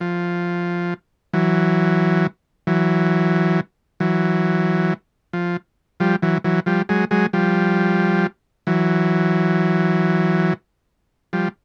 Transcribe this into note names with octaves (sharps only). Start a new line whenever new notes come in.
F3
E3 F#3
E3 F#3
E3 F#3
F3
F3 G3
E3 F#3
E3 F#3
F3 G3
F#3 G#3
F#3 G#3
F3 G3
E3 F#3
F3 G3